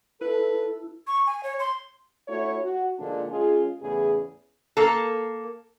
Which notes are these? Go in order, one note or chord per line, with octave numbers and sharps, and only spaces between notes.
E4 A4 B4
C#6
G#5
C#5
C6
A3 D4 E4 F#4 C#5
F#4
A#2 D3 F3 G#3 D4
G#3 C#4 F4 G#4
E2 A2 C#3 G#4
A#3 A4